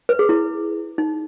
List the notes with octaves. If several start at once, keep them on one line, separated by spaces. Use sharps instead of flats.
B4
G#4
E4
D#4